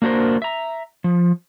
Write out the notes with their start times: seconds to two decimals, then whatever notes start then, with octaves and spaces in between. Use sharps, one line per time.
0.02 A#3 D4 F#4 A#4 C5
0.42 E5 A#5
1.04 F3